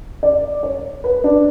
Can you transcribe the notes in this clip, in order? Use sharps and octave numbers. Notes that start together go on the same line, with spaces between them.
D5
C#5
B4
D4